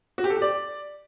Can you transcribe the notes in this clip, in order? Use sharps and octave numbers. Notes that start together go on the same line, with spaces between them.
F#4
G4
A4
G4
D5